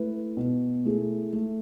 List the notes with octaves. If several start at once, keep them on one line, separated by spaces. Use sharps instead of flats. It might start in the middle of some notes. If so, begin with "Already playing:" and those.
Already playing: A3 E4 B4
B2
A3 E4 G#4
A3